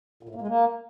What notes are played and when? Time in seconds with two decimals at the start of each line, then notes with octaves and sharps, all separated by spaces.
0.23 A#2
0.29 A2
0.35 A#3
0.41 G#3
0.47 A#3